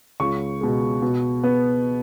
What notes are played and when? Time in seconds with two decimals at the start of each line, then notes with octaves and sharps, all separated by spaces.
0.20 C#2 C#6
0.61 B2 G#3
1.02 B2
1.43 B3